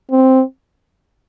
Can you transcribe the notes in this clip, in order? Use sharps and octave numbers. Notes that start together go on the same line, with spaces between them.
C4